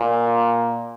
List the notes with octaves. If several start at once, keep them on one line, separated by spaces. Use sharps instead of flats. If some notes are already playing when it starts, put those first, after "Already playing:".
Already playing: A#2